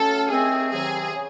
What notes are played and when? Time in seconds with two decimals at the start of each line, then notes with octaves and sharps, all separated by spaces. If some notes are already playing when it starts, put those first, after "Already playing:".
Already playing: A2 F#3 A3 C#4 A4
0.30 D#2 D#3 A3 C4 G#4
0.72 E2 C3 D#3 F#3 C4 G#4
1.14 C#3